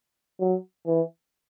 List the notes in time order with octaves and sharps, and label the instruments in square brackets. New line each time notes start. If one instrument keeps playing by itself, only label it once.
[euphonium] F#3
E3